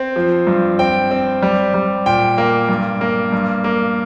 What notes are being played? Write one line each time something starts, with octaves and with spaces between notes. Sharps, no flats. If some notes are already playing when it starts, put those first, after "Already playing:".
Already playing: C4
F3
G2
C4 G5
C4
G3
G3
A#2 G5
A#3
G2
A#3
G2
A#3